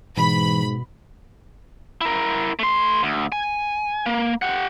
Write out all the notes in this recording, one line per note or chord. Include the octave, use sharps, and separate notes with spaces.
G#2 B2 E3 B5
E4 A#4
A3 C6
D2
G#5
A#3
G4 F#5